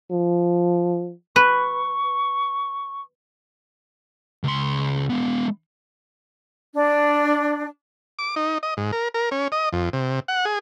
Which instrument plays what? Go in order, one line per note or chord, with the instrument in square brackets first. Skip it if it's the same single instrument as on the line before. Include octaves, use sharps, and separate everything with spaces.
[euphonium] F3
[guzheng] B4 [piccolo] C#6
[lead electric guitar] C#2 C6
G#3 B3
[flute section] D4
[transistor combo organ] D6
D#4
D#5
G#2
A#4
A#4
C#4
D#5
F2
C3
F#5
G#4